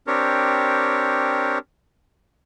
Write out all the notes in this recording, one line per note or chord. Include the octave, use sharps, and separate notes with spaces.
C4 D4 G4 A#4 C#5